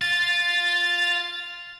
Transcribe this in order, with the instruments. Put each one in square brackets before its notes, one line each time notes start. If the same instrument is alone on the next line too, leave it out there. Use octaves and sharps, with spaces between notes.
[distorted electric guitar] F4 [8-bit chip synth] A6